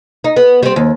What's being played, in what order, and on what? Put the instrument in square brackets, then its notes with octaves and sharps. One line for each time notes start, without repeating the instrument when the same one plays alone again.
[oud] D#4
B3
G3 C4
D#2